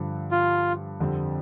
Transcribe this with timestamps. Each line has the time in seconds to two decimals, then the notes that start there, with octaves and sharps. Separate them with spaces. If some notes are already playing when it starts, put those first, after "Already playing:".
Already playing: G2 D3 F3
0.31 F4
1.00 F2 D3 G3 C4